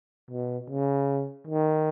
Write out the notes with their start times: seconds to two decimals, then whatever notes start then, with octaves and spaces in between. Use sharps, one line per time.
0.31 B2
0.70 C#3
1.47 D#3